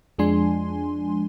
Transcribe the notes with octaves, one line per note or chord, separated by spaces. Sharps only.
F2 F3 G#3 D4 G#5 C6